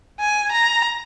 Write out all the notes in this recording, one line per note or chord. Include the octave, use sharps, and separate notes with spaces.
G#5
A#5